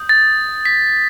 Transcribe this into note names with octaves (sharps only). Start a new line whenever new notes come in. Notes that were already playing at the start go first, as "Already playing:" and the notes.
Already playing: D#6 G6
A6
B6